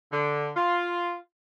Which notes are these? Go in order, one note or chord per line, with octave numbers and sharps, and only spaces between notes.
D3
F4